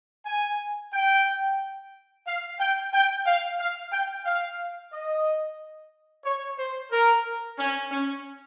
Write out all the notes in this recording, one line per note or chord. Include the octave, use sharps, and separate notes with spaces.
G#5
G5
F5
G5
G5
F5
F5
G5
F5
D#5
C#5
C5
A#4
C#4
C#4